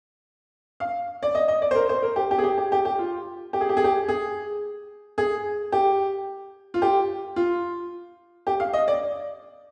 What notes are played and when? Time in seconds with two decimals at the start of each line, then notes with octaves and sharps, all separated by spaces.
0.80 F5
1.23 D5
1.35 D#5
1.48 D#5
1.62 D5
1.71 C5
1.75 A#4
1.89 C5
2.02 A#4
2.16 G4
2.31 G4
2.38 G#4
2.44 G4
2.58 G4
2.72 G4
2.85 G4
2.99 F4
3.53 G4
3.61 G#4
3.69 G4
3.77 G#4
3.84 G4
4.08 G#4
5.18 G#4
5.72 G4
6.74 F4
6.82 G4
7.36 F4
8.47 G4
8.60 F5
8.73 D#5
8.88 D5